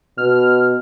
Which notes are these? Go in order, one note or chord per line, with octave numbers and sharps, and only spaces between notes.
B2 F6